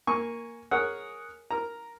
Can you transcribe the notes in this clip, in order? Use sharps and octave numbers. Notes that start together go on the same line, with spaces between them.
A#3 G#5 C#6
G#4 A#4 C#5 F#5
A#4 A#5